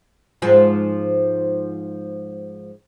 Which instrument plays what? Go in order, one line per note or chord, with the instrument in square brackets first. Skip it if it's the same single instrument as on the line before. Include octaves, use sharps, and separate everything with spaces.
[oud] G#2 F3 G#3